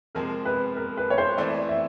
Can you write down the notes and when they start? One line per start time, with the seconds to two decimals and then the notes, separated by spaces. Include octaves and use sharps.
0.15 C3 F3 G#3 C4 A#4
0.45 B4
0.77 A#4
0.97 B4
1.10 C#5
1.18 C5
1.38 E3 A3 C4 E4 D5
1.69 E5